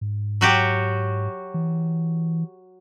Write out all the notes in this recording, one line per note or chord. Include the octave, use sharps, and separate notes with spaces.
G#2
F#3 F#4 G4
E3